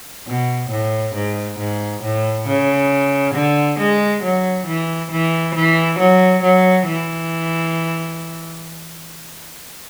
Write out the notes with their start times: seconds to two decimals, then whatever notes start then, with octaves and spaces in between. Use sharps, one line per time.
0.27 B2
0.70 A2
1.15 G#2
1.59 G#2
2.03 A2
2.47 C#3
3.34 D3
3.79 G#3
4.23 F#3
4.66 E3
5.11 E3
5.55 E3
5.99 F#3
6.43 F#3
6.87 E3